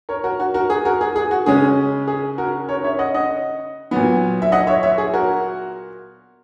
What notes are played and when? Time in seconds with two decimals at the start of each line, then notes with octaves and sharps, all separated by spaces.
0.09 A#4 C#5
0.24 F#4 A#4
0.40 F#4
0.54 F#4 A#4
0.70 G#4
0.85 F#4 A#4
1.01 G#4
1.16 G#4
1.31 F#4
1.46 C#3 G#3 C#4 G#4
2.07 G#4
2.38 F#4 A#4
2.69 A#4 C#5
2.84 C#5 E5
2.99 D#5 F#5
3.14 D#5 F#5
3.91 A#2 F#3 B3
4.42 E5
4.52 D#5 F#5
4.67 C#5 E5
4.83 C#5 E5
4.98 G#4
5.14 F#4 A#4